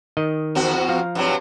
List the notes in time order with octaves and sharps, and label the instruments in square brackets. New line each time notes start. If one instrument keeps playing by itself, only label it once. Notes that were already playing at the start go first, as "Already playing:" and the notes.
[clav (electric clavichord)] D#3 D#5
[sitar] E2 C4 F#4
[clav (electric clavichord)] F3 F5 A#5
[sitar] G2 F#3 C4